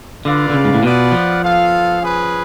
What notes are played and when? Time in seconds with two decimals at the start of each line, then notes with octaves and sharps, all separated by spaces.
0.24 D3 F4 B4 D5 F5
0.50 D3
0.54 C#3
0.64 G#2
0.74 A2
0.83 B2 B3 F4 B4 D5 F#5
1.12 F3
1.42 B3 F4 A4 F5
2.00 C#4 G#4 B4